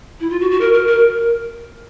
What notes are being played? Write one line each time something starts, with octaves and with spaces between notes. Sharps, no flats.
E4
F4
F#4
F#4
A#4
A#4
A#4